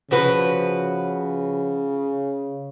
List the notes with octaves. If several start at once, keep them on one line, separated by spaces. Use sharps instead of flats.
C#3 F3 F#4 B4